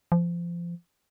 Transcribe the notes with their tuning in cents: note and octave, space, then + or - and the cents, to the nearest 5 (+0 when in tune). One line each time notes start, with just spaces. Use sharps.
F3 -25